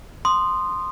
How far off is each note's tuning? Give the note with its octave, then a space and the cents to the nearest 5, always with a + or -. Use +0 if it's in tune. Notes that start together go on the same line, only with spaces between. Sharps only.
C6 +0 D#6 -20